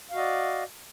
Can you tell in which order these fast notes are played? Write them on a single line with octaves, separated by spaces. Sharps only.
F5 F#4 D#5 D5